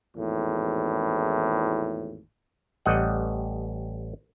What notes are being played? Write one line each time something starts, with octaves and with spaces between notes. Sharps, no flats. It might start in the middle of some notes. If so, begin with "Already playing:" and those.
G#1 E2 A2
A1 G3 D#5 F#5